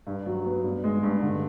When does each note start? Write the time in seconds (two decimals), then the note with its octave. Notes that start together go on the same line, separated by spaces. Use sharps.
0.07 G2
0.26 F#3
0.45 B3
0.64 G2
0.84 G#3
1.03 G2
1.22 D3